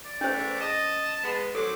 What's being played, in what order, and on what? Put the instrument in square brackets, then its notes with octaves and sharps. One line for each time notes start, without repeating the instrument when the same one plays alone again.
[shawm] D5
[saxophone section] E2 A3 [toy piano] C#4 C5
[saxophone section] D#5 [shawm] A5
[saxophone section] G#3 B3
[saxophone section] D#3 F#3 C4 [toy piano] A4 [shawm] D6